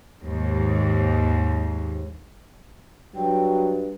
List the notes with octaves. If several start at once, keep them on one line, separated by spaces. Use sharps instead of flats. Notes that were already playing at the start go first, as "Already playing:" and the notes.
D#2 G#2
G2 F#3 G5